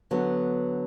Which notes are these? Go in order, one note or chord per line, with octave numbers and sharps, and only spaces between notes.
D3 F#3 B3